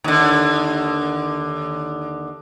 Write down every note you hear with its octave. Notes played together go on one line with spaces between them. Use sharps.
D#2 D3